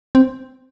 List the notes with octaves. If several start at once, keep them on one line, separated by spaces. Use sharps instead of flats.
C4